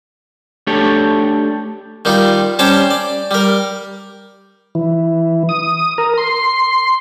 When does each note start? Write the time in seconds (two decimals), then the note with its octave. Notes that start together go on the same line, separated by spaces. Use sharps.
0.67 A3 D4 G4 A4 C#5
2.05 D#3 G3 D#4 F4
2.59 G3 C#4 C5 C#5 G5 A5
2.91 D5
3.31 G3 A#4
4.75 E3
5.49 D#6
5.98 A#4
6.18 C6